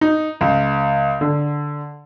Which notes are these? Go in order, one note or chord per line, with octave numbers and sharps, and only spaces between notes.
D#4
C#2
D3